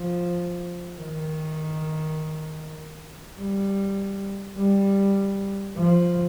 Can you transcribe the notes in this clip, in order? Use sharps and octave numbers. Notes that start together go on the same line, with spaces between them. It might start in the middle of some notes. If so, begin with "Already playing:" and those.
Already playing: F3
D#3
G3
G3
F3